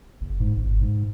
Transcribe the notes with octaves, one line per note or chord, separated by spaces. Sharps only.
F#1
G#2
G1
G#2